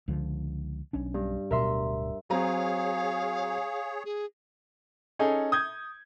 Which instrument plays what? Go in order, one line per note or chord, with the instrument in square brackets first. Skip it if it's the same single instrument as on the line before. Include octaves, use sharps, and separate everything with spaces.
[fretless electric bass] C#2 D3 F3
B1 C#4 D4
[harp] G2
[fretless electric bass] D1 B2 [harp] A#4 E5 C6
[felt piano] F#3 C4 A#5 [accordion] G#4 C#5 [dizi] F5
[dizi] G#4
[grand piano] C#4 D#4 G#4 A4
D#6 G6 G#6